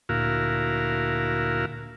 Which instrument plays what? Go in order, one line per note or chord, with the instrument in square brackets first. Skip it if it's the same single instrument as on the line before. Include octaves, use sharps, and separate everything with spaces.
[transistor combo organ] D2 A#2 E4 F#4 A#4 F5